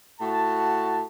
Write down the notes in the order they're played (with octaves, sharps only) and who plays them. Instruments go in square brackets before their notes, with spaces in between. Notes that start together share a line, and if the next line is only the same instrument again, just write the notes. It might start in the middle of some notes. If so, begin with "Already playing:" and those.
[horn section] A2 F#4 A5